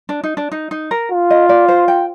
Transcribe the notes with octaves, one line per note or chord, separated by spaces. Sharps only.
D4
D#4
D4
D#4
D#4
A#4
F4
D#5
D5
C5
G5